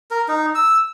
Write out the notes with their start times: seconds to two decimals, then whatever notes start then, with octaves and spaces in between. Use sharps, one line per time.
0.11 A#4
0.28 D#4
0.55 E6